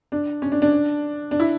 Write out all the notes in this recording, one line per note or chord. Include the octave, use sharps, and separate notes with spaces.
D4
C#4
D4
D4
D4
E4